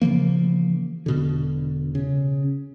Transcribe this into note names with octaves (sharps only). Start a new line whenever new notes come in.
C#3 E3 F3 A#3
E1 B2 D3
C#3